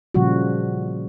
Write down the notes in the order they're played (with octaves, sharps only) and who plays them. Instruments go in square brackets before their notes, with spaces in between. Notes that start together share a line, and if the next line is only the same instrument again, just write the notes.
[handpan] A#2 C#3 F3 G3 F#4